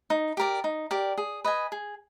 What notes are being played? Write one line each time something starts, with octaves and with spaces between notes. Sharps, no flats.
D#4
G4 A#4 D5
D#4
G4 A#4 D5
G#4
B4 D#5 G#5
G#4